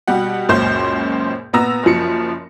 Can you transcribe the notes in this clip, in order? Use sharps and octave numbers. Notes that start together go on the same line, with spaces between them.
B2 G3 G4 F#5
C#2 F#2 A#2 C#4 C5 G6
A#2 B3 A#5 E6 A#6
F#1 F#2 F3 C#7